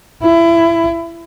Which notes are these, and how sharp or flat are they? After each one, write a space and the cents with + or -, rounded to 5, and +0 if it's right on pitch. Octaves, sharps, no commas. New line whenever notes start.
E4 +25